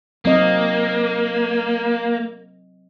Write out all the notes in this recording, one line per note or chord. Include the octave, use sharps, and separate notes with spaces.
F#3 A#3 C4 D#5